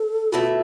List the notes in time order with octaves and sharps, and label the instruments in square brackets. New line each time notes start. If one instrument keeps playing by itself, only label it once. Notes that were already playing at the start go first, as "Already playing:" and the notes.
Already playing: [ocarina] A4
[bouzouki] B2 A3 E4 [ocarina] F4